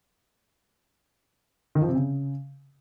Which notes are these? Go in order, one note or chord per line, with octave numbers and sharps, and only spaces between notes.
D#3
F3
C3
C#3